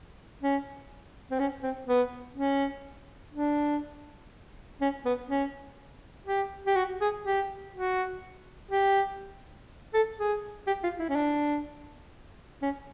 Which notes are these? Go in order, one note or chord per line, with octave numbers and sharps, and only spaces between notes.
C#4
C4
C#4
C4
B3
C#4
D4
C#4
B3
C#4
G4
G4
F#4
G#4
G4
F#4
G4
A4
G#4
G4
F4
E4
C#4
D4
C#4